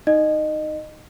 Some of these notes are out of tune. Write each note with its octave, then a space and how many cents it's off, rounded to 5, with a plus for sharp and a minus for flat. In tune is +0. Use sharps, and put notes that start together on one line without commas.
D#4 +0 D#5 -25